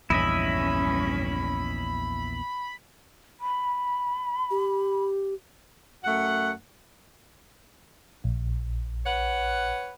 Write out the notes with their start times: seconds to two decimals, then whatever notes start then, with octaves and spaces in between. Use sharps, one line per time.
0.10 A#1 E2 G2 C#4 E4 D#5 E5 B5
3.40 B5
4.51 G4
6.04 F#2 A3 F#5
8.24 A#1
9.05 B4 C#5 F#5